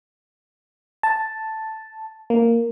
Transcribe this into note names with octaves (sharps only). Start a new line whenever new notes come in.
A5
A#3